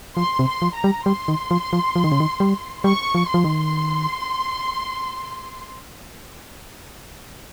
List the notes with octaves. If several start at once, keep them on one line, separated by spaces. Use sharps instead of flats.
F3 C6
C3
C6
F3
A#5
G3
G3 C6
D#3
F3
F3
F3
D#3
C#3
D#3
G3
G3 C#6
F3
C6
F3
D#3